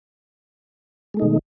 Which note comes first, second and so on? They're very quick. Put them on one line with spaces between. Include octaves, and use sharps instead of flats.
G#3 A3 D#4 B2 D#3